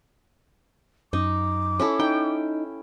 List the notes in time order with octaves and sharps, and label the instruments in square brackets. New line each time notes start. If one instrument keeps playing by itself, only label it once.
[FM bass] F#2 [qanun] D#4 [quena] D6
[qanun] C#4 E4 A4
[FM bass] D#4 [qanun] G5